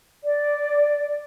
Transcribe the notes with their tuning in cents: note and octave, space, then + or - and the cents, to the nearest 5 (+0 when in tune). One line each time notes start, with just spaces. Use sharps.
D5 -5